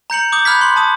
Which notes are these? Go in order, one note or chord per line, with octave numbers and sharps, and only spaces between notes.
A#5 G6 C#7 F#7
D6 D#6 G6
B5 F6 F#6 G#6 B6
C6 F#7
A5 D#6